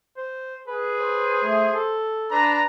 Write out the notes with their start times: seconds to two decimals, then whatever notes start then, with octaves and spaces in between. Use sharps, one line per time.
0.17 C5
0.68 G#4 B4
1.00 C5
1.43 A3
1.75 A4
2.31 D4 B4 A#5